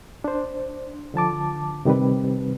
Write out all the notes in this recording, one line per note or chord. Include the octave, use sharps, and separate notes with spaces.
D4 C5
D3 F3 A5 D6
C3 D#3 G3 C4 B4